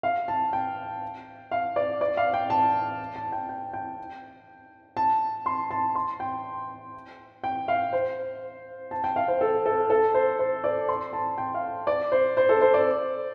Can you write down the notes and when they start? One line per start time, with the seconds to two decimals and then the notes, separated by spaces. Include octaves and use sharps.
0.03 F5
0.28 A5
0.53 G5
1.51 F5
1.76 D5
2.01 D5
2.17 F5
2.34 G5
2.50 A5
3.16 A5
3.32 G5
3.49 G5
3.73 G5
4.97 A5
5.46 C6
5.71 A5
5.95 C6
6.20 G5
7.44 G5
7.68 F5
7.93 C5
8.91 A5
9.04 G5
9.16 F5
9.28 C5
9.41 A4
9.66 A4
9.90 A4
10.14 C5
10.39 C5
10.64 D5
10.88 C6
11.13 A5
11.38 G5
11.54 F5
11.87 D5
12.12 C5
12.37 C5
12.49 A4
12.61 C5
12.74 D5